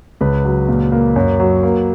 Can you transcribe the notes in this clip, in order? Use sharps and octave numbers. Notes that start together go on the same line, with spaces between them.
C#2 B4
F#3
A#2
A#3
F#2
F#3
A#3